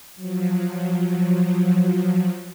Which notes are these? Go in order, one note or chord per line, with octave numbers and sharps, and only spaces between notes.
F3 F#3